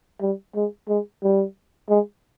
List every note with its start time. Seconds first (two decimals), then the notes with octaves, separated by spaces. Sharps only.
0.21 G3
0.55 G#3
0.88 G#3
1.23 G3
1.89 G#3